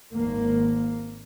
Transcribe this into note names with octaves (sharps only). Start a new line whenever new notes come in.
G#1 A#3